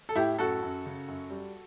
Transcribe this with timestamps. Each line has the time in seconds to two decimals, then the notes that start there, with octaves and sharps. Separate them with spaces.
0.09 A4
0.16 A2 E4 G4
0.38 F#2 F#4 A4
0.63 F#2
0.85 C#3
1.08 F#2
1.30 G3